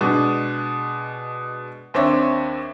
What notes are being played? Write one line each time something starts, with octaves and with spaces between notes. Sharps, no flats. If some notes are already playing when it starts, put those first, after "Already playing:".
B2 G#3 D4
D#2 C4 D4 C#5 E5